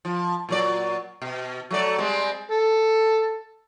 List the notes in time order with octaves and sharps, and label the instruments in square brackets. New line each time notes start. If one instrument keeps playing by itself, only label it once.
[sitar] F3
A#2 F#3 D5
B2
F#3 A3 D5
G3 G#3 C4
[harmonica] A4